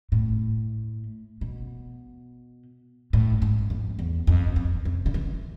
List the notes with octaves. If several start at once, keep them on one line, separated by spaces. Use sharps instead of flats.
A2
B2
A2
G#2
F2
E2
F2
F2
C3
D3
E3